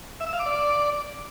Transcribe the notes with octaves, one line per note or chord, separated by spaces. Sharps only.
E5
E6
F5
D6
D5